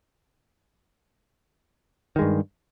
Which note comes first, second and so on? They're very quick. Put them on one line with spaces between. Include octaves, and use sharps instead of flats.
D#3 G#3 G2